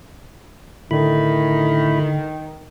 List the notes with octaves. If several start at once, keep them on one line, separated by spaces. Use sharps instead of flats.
A2 D3 D#3 E4 B5